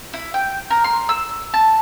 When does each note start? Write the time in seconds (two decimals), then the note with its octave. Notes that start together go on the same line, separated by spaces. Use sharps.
0.13 E4
0.34 G5
0.70 A#4
0.84 C6
1.09 E6
1.54 A5